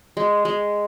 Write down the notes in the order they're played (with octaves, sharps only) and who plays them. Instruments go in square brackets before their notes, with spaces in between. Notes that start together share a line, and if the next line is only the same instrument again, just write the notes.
[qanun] G#3
G#3